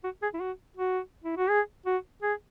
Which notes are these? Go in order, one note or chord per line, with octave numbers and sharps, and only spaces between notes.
F#4
G#4
E4
F#4
F#4
E4
F#4
G#4
F#4
G#4